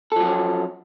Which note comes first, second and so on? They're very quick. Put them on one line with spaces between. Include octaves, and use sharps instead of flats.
A4 F3 F#3 C#4